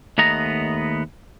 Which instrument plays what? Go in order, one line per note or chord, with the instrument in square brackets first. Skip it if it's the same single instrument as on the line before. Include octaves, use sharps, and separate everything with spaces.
[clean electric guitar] D#2 A3 B3 D#5 A#5